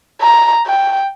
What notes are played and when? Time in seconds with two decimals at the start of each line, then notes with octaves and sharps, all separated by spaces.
0.21 A#5
0.66 G5